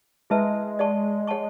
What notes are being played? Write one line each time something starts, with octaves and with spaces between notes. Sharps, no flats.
G#3 E4 G#4 B4 E5 A5
G#4 D5 F#5 A5 C#6
G#4 C#5 F#5 A5 C#6